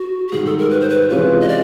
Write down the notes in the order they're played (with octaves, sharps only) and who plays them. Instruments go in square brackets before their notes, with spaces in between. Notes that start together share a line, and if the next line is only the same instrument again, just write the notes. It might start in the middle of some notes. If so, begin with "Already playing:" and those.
Already playing: [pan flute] F#4
G4
[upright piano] G#2 D#3 G3 [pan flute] G#4
[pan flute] A4
A#4
B4
C5
B4
[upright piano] C3 E3 G#3 C#4 F4 [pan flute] B4
[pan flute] D#5
D5